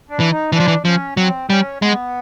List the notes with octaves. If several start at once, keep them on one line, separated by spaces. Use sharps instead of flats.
D4
E3
D#4
E3 D4
F3
E3
F3 C#4
F#3 C4
G3 C#4
G#3 B3